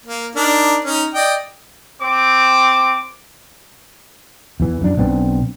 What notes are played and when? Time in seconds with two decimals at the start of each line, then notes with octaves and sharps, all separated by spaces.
0.06 A#3
0.36 D4 D#4 A#4
0.84 C#4 D#4
1.14 D5 D#5 G5
2.00 C4 D6
4.60 E2 E3
4.81 F#2 D4
4.97 B1 B3 C4 D4